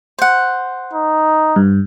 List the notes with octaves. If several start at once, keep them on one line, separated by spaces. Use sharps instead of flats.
C5 F#5
D#4
G2